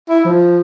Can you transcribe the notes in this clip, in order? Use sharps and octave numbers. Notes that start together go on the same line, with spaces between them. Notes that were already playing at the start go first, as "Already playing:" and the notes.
E4
F3